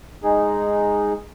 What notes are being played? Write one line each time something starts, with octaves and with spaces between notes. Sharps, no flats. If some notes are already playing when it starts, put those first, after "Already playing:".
G#3 D#4 G#4